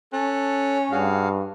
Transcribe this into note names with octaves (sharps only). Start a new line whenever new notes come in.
C#4 A4 F#6
G2 F#4 G#4 F5